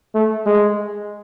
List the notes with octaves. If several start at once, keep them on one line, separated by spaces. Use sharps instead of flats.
A3
G#3